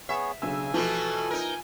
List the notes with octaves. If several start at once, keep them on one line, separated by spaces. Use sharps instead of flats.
B3 G#4 C#5 E5
B1 C#3 D4 G#5 E6
B2 E3 F3 A3 A4
D#4 A#4